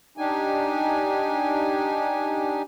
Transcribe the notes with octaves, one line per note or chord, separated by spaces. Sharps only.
D4 D#4 G4 G#5